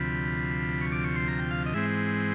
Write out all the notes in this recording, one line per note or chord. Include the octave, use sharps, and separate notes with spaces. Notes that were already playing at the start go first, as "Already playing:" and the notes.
Already playing: D2 C3 F3 B5
C#6
D6
C#6
C6
A#5
G5
F5
D#5
G#2 E3 G#3 C4 E5